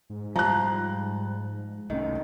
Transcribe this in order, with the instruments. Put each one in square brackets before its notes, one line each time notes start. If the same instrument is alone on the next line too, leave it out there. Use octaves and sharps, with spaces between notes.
[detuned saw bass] G#2
[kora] F3 [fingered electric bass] G3 [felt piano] A#5 F#6
[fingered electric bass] C2 A3 C#4 [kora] D#3